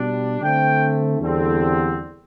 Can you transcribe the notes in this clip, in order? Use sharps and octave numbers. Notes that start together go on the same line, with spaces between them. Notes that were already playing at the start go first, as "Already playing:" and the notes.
Already playing: B2 G3 D4
D3 A3 C4 G5
E2 D3 G3 C4